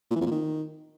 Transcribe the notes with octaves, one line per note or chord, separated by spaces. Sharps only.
A#2
E3
F2
A#2
D#3